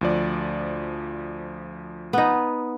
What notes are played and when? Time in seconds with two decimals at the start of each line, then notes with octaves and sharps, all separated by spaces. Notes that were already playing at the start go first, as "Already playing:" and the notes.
0.01 D2 F3 D5
2.13 B3 D#4